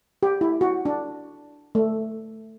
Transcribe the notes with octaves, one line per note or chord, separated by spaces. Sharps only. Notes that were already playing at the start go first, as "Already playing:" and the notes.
G4
E4
F#4
D4
A3